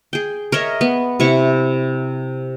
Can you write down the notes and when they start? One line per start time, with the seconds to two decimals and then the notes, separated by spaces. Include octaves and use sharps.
0.13 G#4 G5
0.52 A#4 C#5 D#5 E5
0.81 B3
1.20 C3 E4 C#6